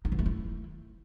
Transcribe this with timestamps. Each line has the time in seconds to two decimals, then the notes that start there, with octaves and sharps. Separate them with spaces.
0.05 D#4
0.12 E3
0.19 A3
0.26 E4